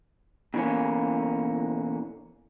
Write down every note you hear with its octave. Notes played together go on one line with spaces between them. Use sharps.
B2 D3 E3 A#3 C#4